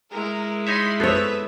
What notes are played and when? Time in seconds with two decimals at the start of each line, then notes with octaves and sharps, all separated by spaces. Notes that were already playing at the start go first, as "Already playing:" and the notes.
0.11 G#3 E4 A#4
0.67 D#4 C#5 E5 B5 C6 C7
1.00 B3 C4 A4 B4 C#5 E5 B6